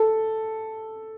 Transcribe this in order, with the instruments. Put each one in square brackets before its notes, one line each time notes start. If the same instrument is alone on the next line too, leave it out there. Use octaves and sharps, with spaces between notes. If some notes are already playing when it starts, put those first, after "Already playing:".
Already playing: [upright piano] A4